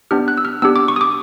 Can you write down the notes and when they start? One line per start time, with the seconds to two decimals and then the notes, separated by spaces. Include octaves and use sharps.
0.11 B3 D4 G4 F6
0.28 F#6
0.37 E6
0.45 F6
0.62 B3 D4 G4 E6
0.76 D6
0.88 C#6
0.96 D#6
1.01 D6